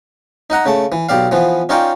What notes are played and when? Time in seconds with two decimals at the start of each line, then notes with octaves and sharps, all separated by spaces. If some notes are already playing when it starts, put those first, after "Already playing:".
0.50 D#4 D#5 F#5 A#5
0.66 C#3 A3 A5
0.92 E3
1.09 B1 G4 D5 F5
1.31 E3 F3 B3
1.69 C#4 D#4 F4 C#5 D5 G5